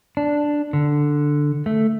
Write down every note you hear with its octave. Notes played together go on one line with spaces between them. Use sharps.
D4
D3
A3